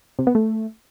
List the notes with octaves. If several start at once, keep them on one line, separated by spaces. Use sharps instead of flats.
C3
B3
A3